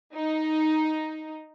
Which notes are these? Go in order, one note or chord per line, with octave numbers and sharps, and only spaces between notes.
D#4